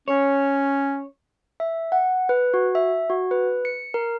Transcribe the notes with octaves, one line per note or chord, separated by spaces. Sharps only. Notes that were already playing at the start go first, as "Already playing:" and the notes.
C#4 C#5
E5
F#5
B4
F#4
E5
F#4
B4
C#7
A#4